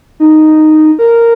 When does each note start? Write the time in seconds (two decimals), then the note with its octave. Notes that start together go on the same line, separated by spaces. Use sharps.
0.20 D#4
0.99 A#4